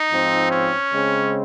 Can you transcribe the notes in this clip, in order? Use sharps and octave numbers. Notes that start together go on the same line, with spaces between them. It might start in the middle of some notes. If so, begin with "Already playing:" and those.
Already playing: D#4
G#2 F3 C4
C#4
C#3 G#3 C4